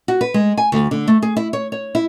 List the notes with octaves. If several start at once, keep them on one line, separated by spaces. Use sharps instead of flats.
F#4
B4
G#3
G#5
D2
D3
A3
G#4
E4
C#5
C#5
E4